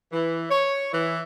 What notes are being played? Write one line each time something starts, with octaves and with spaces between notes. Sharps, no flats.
E3
C#5
E3